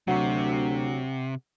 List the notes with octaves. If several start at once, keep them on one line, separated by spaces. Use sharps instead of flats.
D2 C3 F#3 F#5 A#5 C#6